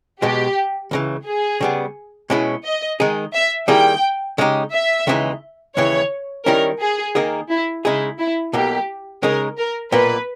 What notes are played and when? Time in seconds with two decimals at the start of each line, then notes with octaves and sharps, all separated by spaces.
0.22 B1 B2 G#3 G4
0.91 C#2 C#3 E3
1.26 G#4
1.61 C#3 G3 B3
2.30 B2 G#3 C#4 E4 G#4
2.64 D#5
3.00 D#3 G#3 D#4 G#4
3.34 E5
3.68 D#3 G3 A#3 E4 G#4 G5
4.38 C#3 G#3 D#4 G4
4.72 E5
5.07 D#2 C#3 E3 G#3 D#4
5.76 D#2 C#3 E3 C#5
6.46 D#3 G3 C#4 E4 A#4
6.81 G#4
7.15 D#3 A#3 D#4 G#4
7.50 E4
7.84 C#3 G#3 D#4 E4 G#4
8.19 E4
8.53 B1 B2 A#3 G4
9.23 C#3 G#3 D#4 G#4 A#4
9.58 A#4
9.92 B1 A#2 A#3 B4